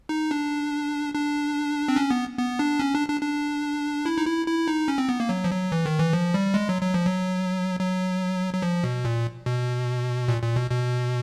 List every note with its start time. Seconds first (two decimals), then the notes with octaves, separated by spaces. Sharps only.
0.09 D#4
0.31 D4
1.14 D4
1.88 C4
1.96 C#4
2.11 B3
2.38 B3
2.59 D4
2.80 C#4
2.95 D4
3.08 D4
3.21 D4
4.06 E4
4.18 D#4
4.26 E4
4.47 E4
4.68 D#4
4.88 C#4
4.98 C4
5.09 B3
5.20 A#3
5.29 F#3
5.44 F3
5.51 F#3
5.72 E3
5.86 D#3
5.98 E3
6.13 F3
6.34 G3
6.54 G#3
6.69 F#3
6.82 F#3
6.94 F3
7.07 F#3
7.80 F#3
8.54 F#3
8.62 F3
8.84 B2
9.05 A#2
9.46 B2
10.28 A#2
10.42 A#2
10.56 B2
10.71 B2